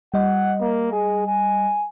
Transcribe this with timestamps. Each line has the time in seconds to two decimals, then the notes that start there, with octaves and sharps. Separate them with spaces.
0.14 G3 D#5 F#5
0.60 A#3
0.92 G#4
1.27 G#5